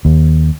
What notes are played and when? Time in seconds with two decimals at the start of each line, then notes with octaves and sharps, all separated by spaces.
0.05 D#2